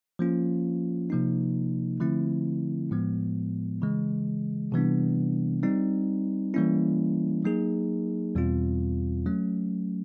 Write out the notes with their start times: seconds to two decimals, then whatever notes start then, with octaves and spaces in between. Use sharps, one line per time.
0.19 F3 A#3 C#4 F4
1.10 C3 F3 A#3 D#4
2.00 D3 F3 A3 C4 E4
2.91 A2 F3 G#3 B3
3.82 C#3 E3 G#3
4.72 C3 E3 G3 B3 D4
5.63 G3 C4 D#4
6.54 E3 G3 A#3 C#4 E4
7.45 F#3 A#3 D#4 G#4
8.35 E2 B2 G3 C4 F4
9.26 F#3 A3 C#4